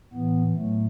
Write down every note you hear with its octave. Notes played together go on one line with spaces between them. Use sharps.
A2 E3 B3
A2 F#3 A3